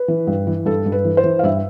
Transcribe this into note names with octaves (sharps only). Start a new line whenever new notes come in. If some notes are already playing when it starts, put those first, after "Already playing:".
Already playing: B4
E3
G2
E3
G2 A4
G2
B4
E3
C5
E3
F5
G2 E5